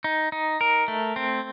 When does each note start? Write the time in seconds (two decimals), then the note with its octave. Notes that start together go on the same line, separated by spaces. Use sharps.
0.04 D#4
0.32 D#4
0.61 A#4
0.88 A3
1.16 C4